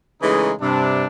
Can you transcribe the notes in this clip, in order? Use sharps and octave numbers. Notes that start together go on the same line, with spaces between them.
C#3 E3 G#3 A3 D#4
G2 C3 D4